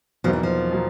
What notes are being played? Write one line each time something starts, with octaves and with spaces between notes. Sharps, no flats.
E2 B2 F3 F#3 A#3 D#4
E3
F3
B2 F#3 A#3